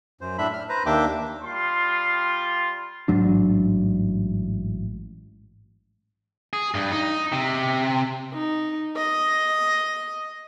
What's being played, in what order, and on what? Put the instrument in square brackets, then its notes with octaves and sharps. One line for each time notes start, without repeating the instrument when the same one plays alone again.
[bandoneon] F#2 C5
A2 D4 E5 B5
F6
B4 C5 A#5
D#2 A#3 D4 E5 G5 D6
[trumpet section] G3 F4 C6
[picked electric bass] A1 G#2 F#3 D4
[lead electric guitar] G#4
G2
D#4
C3
[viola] D#4
D#5